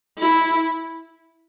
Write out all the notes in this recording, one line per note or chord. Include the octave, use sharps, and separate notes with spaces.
E4